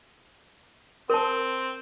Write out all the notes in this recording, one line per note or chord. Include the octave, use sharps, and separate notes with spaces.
C4 A#4 A5